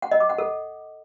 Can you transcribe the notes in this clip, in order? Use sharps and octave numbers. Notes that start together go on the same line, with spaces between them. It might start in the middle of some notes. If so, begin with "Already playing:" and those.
F#5
D#5
D6
F#5
A4